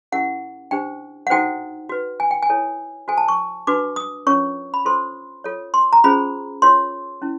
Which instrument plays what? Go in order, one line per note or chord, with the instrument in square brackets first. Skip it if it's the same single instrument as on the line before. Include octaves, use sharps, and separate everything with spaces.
[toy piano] C#4 E4 G4 A#4 F#5
D4 G4 C5 G5
F#5
D#4 F#4 A4 C5 G5
F#4 B4
G#5
G5
G#5
E4 A4 C#5
F#4 A4 C5 G#5
A5
C#6
D4 F#4 B4 D6
D#6
C#4 F4 A#4 C#5 C#6
B5
F4 A4 C5 C6
F4 A4 C#5
C6
A#5
C#4 F4 G#4 C5 B5
F4 A#4 C#5 C6
C#4 E4